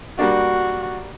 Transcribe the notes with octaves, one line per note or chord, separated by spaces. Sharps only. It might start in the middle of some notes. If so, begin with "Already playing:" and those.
G3 A#3 D4 F#4